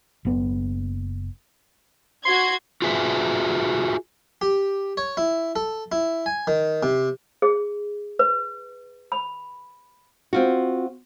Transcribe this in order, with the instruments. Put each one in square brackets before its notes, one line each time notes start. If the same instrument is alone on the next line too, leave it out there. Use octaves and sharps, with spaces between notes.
[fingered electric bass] F#1 B3
[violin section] F#4 G#6 [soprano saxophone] C6
[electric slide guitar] F4 F#4 G#4 B4 E5
[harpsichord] G4
C#5
E4
A4
E4
G#5
D#3
C3
[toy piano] G#4
B4
B5
[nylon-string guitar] C4 F4 F#4